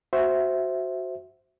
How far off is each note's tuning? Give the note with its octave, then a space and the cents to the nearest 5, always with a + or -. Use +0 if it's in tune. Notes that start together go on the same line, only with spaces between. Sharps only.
F#4 +0 C5 +0 E5 +0